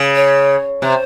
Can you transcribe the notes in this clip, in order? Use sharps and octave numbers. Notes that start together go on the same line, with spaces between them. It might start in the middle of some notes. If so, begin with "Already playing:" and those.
Already playing: C#3
C#5
C3 C5